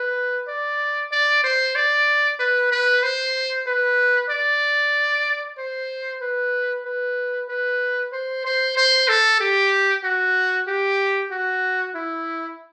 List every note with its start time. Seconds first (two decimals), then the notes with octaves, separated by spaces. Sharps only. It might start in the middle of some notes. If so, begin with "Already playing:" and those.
Already playing: B4
0.48 D5
1.12 D5
1.44 C5
1.75 D5
2.39 B4
2.71 B4
3.03 C5
3.67 B4
4.30 D5
5.58 C5
6.21 B4
6.85 B4
7.49 B4
8.12 C5
8.45 C5
8.77 C5
9.08 A4
9.40 G4
10.04 F#4
10.68 G4
11.31 F#4
11.95 E4